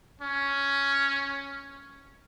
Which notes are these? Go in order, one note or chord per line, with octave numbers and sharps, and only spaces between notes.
C#4